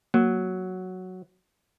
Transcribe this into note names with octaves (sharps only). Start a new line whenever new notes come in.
F#3 A#3